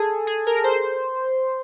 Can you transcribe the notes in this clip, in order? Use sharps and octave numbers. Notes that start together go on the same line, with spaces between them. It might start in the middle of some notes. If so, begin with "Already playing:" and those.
Already playing: G#4 A4
G#4
A#4
C5